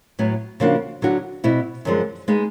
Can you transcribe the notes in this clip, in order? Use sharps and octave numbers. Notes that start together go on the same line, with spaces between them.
A2 F#3 B3
C#3 F3 A#3 D4 F#4
D3 F#3 B3 D4 F#4
B2 G3 C4 E4
F#2 D3 F3 G#3
G#3 B3 D#4